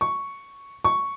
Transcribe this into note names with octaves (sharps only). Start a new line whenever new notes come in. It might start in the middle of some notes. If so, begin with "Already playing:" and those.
C#6
C#6